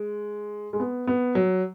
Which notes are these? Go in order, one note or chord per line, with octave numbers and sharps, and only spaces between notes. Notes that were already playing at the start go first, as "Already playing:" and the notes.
Already playing: G#3
G#3
B3
B3
F#3